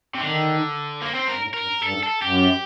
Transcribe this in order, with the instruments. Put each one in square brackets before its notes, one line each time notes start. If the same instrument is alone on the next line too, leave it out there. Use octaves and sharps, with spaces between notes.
[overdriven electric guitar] C3
[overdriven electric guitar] D3 [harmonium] D#3
[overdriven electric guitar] A#3
C4
[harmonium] G2 [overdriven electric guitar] A#4
[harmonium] A2
[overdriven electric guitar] A#4
[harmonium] G2
[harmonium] G2 [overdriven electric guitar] A4
[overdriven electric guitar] A4
[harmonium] F#2 [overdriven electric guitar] G4